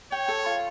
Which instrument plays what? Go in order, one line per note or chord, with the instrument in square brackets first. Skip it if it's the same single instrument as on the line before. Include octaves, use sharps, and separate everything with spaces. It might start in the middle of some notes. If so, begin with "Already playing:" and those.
[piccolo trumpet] C#5 [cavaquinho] G5
[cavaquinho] A4
F4